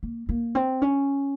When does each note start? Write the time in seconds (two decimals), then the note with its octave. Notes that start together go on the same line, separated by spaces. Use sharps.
0.03 A#3
0.29 A#3
0.55 C4
0.82 C#4